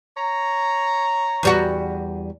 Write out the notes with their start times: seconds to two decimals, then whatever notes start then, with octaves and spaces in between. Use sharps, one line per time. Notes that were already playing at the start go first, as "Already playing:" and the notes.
0.16 C#5 A#5
1.43 E2 G3 F#4